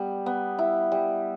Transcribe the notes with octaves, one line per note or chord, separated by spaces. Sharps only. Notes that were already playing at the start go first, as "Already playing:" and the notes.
Already playing: G3 B3
B3
E4
G3